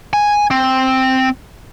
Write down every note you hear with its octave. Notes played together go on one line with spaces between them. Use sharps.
G#5
C4